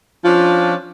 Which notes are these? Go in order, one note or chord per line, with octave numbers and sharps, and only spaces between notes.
F3 C#4 D4 F4